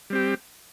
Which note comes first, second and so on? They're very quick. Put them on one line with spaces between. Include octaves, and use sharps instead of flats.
G3 C4 G4